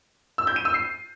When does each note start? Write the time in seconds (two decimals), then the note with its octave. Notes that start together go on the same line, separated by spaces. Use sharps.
0.38 E6
0.47 G6
0.56 D#7
0.65 E6
0.74 C7